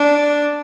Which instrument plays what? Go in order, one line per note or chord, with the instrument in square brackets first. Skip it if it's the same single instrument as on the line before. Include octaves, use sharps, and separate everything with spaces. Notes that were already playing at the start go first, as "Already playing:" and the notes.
Already playing: [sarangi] D4